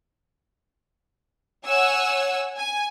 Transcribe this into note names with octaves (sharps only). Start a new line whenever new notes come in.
C#5 F#5 G#5 E6
G#5